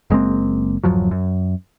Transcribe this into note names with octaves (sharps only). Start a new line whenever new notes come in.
F#1 G#3 A#3 C4
D1 F#2 F3 F#3
F#2